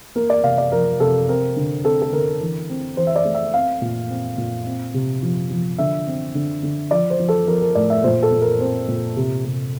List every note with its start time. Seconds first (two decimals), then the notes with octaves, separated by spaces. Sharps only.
0.15 A#3 A#4
0.30 D5
0.43 C3 F5
0.58 D5
0.72 F3 A#4
1.00 C3 A4
1.29 C4 A#4
1.56 D3
1.84 C4 A4
2.02 A4
2.12 D3 A#4
2.41 E3
2.69 C4
2.97 E3 C5
3.07 E5
3.16 D5
3.25 A3
3.35 E5
3.53 C4 F5
3.82 A#2
4.10 C4
4.38 A#2
4.66 C4
4.94 C3
5.22 F3
5.50 F3
5.78 D3 E5
6.07 C4
6.35 D3
6.63 D3
6.91 F3 D5
7.10 C5
7.19 F3
7.29 A4
7.47 F3 A#4
7.62 A#4
7.75 A2 D5
7.90 E5
8.04 A#2 C5
8.23 A4
8.32 A#2
8.41 A#4
8.60 C4 C5
8.88 A#2
9.17 C3
9.45 C3